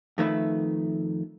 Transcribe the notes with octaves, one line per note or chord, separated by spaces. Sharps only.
F2 D#3 A3 B4 E5